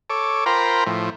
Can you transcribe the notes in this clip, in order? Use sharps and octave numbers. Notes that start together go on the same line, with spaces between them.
A4 C#5 D6
F4 A#4 C5 G5 A#5 B5
A2 F3